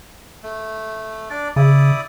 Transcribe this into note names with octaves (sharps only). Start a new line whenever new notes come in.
A3
D4 D5
C#3 E4 D5 D#6